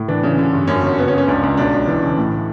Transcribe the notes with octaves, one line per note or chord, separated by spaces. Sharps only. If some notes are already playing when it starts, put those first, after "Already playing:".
Already playing: A2
E3 D4
C#3
D3
G2
F#2 C#4
G1
C#3 B3
C#4
C#3
C#4
C#2 D4
C#2
B1 D4
B1
E3
C#3
A2